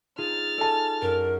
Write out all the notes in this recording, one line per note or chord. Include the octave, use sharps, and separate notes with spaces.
D#4 F4 G#4 F6 A6
A4 D5 G#5 A5
F#2 A#4